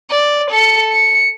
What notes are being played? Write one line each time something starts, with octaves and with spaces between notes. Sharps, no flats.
D5
A4 C#7
C#7